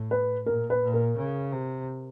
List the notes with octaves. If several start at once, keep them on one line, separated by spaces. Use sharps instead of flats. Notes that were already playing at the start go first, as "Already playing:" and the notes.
Already playing: A2
B4
A#2 A#4
B4
A#2
A#4
C#3
C3